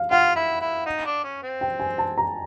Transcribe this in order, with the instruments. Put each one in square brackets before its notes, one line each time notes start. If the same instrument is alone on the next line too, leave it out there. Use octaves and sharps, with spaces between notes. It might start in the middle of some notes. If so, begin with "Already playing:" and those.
Already playing: [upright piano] F5
[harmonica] F4 [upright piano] F#5
[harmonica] E4
E4
D#4
D4
C#4
C4
[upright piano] G5
G#5
A5
A#5